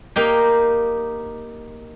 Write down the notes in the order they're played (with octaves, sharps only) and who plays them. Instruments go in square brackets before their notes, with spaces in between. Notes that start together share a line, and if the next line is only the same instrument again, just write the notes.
[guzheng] A#3 D#4 G4